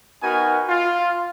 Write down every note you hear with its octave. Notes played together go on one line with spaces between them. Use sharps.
B3 D#4 F#4 A#4 G#5
F4